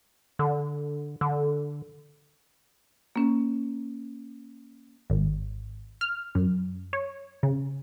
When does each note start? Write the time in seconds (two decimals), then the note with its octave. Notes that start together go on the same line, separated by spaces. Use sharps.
0.39 D3
1.21 D3
3.16 A#3 C#4
5.10 G#1
6.01 F6
6.35 F#2
6.93 C#5
7.43 C#3